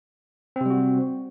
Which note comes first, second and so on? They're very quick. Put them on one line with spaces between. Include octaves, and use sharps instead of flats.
C4 C3 G3 F#4